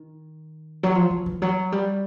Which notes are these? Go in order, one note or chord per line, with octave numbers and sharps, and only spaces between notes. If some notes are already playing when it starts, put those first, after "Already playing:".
Already playing: D#3
F#3
F3
F3
E3
F#3
G3